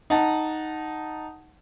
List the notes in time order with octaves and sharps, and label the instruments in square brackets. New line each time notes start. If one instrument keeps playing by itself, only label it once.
[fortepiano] D#4 F#5 A5